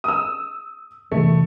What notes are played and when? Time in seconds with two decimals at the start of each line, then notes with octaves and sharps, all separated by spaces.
0.04 D#6 E6
1.12 E1 C3 E3 A3